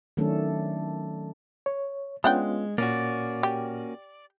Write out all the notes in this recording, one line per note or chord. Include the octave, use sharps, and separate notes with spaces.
D#3 F#3 A3 C#4 D4 A4
C#5
G#3 B3 C#4 D4 F4 F#5 G5
A#2 A#3 C#4 F#4 D5
G4